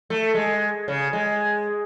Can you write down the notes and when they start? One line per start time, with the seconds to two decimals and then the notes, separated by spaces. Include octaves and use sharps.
0.10 A3
0.34 G#3
0.88 C#3
1.13 G#3